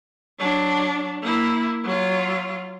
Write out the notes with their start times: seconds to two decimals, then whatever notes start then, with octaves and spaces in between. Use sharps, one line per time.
0.39 F#3 D4
1.22 A#3 E4
1.84 F#3 F4